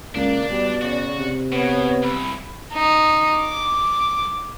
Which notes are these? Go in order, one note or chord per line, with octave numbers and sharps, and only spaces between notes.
C#2 A#3 D4 D5
B2 G3
C#3 F#4
C3
B2 B3 C#5
C2 B5
D#4
D6